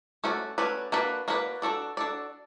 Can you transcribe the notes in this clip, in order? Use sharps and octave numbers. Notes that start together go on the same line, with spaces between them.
A3 C#4 F#4 B4 D5
A3 C#4 F#4 B4 D5
A#3 D4 F#4 B4 D5
A#3 D4 F#4 B4 D5
D4 F#4 A4 D5
D4 F#4 A4 D5